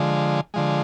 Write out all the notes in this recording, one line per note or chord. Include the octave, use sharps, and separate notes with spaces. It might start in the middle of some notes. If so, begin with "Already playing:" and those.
Already playing: D3 F3 G#3
D3 F3 G#3